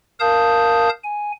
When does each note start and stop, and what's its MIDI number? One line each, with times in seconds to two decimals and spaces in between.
0.20 0.89 70
0.20 0.89 77
0.20 0.89 81
0.20 0.89 87
0.20 0.89 91
1.04 1.32 80